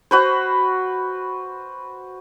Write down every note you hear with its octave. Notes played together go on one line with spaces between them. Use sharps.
F#4 B4 C5